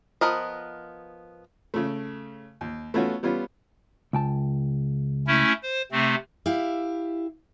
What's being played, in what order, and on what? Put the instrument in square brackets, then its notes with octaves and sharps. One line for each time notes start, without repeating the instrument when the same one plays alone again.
[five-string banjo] F3 B3 A#4 D#5
[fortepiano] C#3 A3
D#2
A3 B3 C#4 F4 F#4
G3 B3 C#4 F4
[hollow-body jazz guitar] C#2 G5 A5
[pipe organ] A3 C#4 E4
C5
C3 A3 C4
[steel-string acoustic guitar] E4 G4 F5